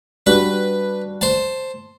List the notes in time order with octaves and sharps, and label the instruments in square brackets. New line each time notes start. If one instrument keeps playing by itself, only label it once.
[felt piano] G3 D4 F#4 [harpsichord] B4
[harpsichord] C5 A5